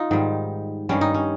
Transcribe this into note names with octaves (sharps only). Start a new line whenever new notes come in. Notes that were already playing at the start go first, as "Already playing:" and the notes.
Already playing: D#4 F4
G#2 D#3 G3
G2 D#3 G3 C#4
D#4
C#4